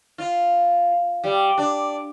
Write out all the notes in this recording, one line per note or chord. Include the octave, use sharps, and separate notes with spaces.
F4
G3
D4